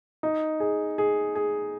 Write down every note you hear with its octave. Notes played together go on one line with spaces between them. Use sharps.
D#4
G#4
G#4
G#4